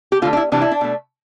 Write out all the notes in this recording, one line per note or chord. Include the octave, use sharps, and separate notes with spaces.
G4
D3 A3 F4
D4
E4
C3 E3 G3 D4
E4
D4
B2 A3